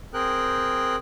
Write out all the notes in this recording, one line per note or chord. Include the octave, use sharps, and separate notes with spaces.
C4 G#4 A#4 G5 F#6